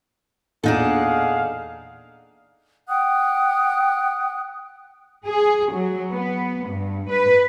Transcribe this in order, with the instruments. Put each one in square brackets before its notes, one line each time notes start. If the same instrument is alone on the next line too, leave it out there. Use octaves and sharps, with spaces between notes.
[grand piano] E2 A#2 [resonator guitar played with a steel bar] D4 D#4 A4 [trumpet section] G#4 F5 F#5
[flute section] F#5 G5 D#6 F#6
[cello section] G#4
F#3
B3
G2
B4